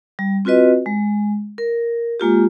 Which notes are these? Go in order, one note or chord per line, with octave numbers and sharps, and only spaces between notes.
G3
C4 F4 F#4 B4 D#5
G#3
A#4
G#3 A#3 F4 G4